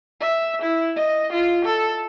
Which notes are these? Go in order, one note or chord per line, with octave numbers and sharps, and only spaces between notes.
E5
E4
D#5
F4
A4